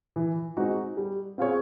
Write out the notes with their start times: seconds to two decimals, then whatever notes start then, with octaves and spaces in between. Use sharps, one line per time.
0.16 E3
0.57 G#3 C4 D#4 F#4
0.97 G3
1.38 C4 F4 G#4 C#5